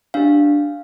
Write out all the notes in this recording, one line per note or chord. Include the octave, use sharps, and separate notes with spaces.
D4 G4 F5